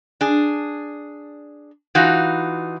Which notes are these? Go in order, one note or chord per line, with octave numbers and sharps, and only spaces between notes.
D4 G#4
E3 D#4 F4 F#4